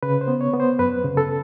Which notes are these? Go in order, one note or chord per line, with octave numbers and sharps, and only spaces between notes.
C#3 B4
C5
B3
C#5
B3
C5
F#2 B4
C#3
A4